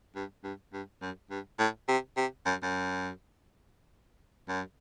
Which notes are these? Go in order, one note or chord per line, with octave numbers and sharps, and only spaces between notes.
G2
G2
G2
F#2
G2
A2
C3
C3
F#2
F#2
F#2